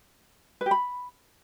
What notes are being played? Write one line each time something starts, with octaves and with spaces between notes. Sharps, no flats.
B4
G4
B5